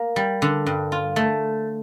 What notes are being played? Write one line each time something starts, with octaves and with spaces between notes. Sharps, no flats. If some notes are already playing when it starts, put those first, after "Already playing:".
Already playing: A#3
G3
D3
G2
F4
A3